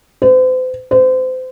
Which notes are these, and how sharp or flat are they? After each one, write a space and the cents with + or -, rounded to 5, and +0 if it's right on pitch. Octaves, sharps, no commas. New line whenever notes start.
C5 -40
C5 -30